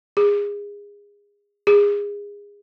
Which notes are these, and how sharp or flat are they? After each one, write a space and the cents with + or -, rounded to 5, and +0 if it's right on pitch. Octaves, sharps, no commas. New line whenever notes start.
G#4 -25
G#4 -25